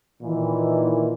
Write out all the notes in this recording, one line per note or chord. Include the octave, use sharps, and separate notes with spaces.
A#2 D#3 E3